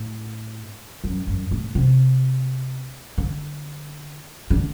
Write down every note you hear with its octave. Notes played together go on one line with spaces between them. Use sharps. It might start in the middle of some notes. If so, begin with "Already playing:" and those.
Already playing: A2
F#2
F#2
A2
C3
D3
D3